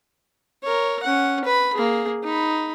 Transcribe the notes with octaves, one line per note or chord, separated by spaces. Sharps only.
A#4 C#5
C#4 F#5
B4 B5
A#3 G#4
D#4 B5